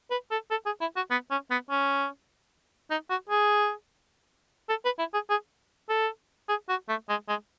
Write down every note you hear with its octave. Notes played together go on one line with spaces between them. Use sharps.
B4
A4
A4
G#4
E4
F#4
B3
C#4
B3
C#4
D#4
F#4
G#4
A4
B4
E4
G#4
G#4
A4
G#4
F#4
A3
G#3
G#3